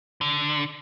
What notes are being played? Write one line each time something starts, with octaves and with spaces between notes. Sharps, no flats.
D3